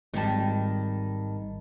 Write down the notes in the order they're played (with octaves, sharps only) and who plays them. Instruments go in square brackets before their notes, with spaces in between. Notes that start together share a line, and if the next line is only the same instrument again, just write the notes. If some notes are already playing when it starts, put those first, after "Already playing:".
[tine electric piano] G#1 A5 [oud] D#3 G3